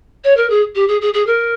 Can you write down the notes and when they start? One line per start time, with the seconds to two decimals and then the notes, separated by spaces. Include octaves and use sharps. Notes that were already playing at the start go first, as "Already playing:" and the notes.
0.24 C#5
0.37 A#4
0.50 G#4
0.75 G4
0.88 G#4
1.01 G#4
1.14 G#4
1.26 A#4